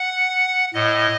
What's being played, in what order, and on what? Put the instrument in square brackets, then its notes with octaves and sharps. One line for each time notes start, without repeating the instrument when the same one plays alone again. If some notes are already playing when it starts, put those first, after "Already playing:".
Already playing: [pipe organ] F#5
A2 D#5